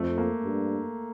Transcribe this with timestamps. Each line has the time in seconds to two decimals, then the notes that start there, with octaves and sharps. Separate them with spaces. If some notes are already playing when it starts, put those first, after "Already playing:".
Already playing: F2 A3
0.18 A#3
0.43 G2